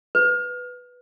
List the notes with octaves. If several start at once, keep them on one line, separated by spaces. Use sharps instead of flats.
B4